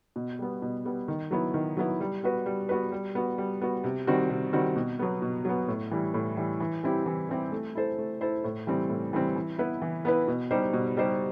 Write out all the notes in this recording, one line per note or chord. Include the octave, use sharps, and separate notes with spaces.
B2
G3 B3
B2
G3 B3
D#3
F#3 B3 E4
D#3
F#3 B3 E4
G3
B3 F#4 B4
G3
B3 F#4 B4
G3
B3 F#4
G3
B3 F#4
C3
D#3 G3 C4 F#4
C3
D#3 G3 C4 F#4
B2
F#3 B3
B2
F#3 B3
A2
E3 G3
A2
E3 G3
E3
G3 C4 E4 G4
E3
G3 C4 E4 G4
A3
E4 A4 C5
A3
E4 A4 C5
A2
E3 G3 C4
A2
E3 G3 C4
E3
B3 E4 B4
E3
B3 E4 B4
B2
G3 D#4 G4 C5
B2
G3 D#4 G4 C5